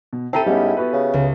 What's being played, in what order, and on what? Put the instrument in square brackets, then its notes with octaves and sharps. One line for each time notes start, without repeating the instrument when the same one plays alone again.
[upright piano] B2
[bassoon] C4 [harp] E4 G4 A4 [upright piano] A5 A#5 D#7
[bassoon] G#2 [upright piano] G3 B3 C#4
[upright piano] B3 F#4 B4
[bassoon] C#3
[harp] C#2